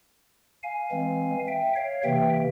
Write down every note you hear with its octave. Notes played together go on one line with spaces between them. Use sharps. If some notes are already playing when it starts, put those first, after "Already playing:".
F5 G#5
E3 G#3 C4
E5 G5
C#5 F5
C3 E3 A#3 E5 G5